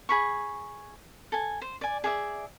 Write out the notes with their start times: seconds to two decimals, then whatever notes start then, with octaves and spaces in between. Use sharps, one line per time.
0.09 G#4 B5 C#6
1.32 A4 G#5
1.62 C5
1.81 D5 G#5
2.04 G#4 D5 E5